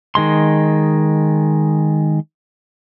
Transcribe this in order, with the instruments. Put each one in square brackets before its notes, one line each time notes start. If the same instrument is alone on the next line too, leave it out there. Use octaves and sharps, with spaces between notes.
[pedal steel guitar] D#3 G#3 C6